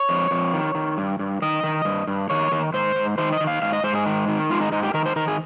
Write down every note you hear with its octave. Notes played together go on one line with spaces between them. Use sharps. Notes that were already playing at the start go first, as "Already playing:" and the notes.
Already playing: C#5
F2
F2
D#3
D#3
G2
G2
D#3 D#5
D#3
G2
G2
D#3 C#5
D#3
G#2 C5
G#2
D#3 C5
D#5
D#3
F5
G#2 F5
D#5
G#2 C5
G#4
D#3
D#3
G#2 F4
D#4
G#2 D#4
G4
D#3 A#4
C5
D#3 A#4
G#4